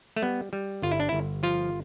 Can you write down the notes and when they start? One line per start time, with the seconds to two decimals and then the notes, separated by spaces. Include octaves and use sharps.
0.16 A3
0.23 G3 B3
0.53 G3
0.82 G1 F4
0.91 E4
1.00 D4
1.09 G1 E4
1.43 F3 F4